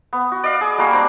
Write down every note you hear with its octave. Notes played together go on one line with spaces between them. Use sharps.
B3
F#4
D5 D#5 F5
G#4
G3 A#3 F#4 C6
C4 D4